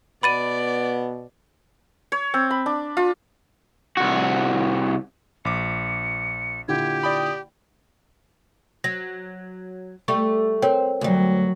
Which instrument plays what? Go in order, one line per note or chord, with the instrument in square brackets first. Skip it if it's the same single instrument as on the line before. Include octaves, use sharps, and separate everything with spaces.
[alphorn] B2 [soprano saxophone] B3 [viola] D5 [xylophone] B5 A6 D#7
[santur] C#5
C4
B5
D4
F4
[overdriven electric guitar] C2 F#4
[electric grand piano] A#1 D6 [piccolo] C#7
[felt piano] A#2 D3 E4 [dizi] G4 [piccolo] G#6
[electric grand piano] D5 G5 B5 [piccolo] D#6
[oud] F#3 [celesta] A#6
[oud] G3 A3 G4 [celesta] C#6
[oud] C4 [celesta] A#4 C#5 G5
[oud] D2 G3 [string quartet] F#3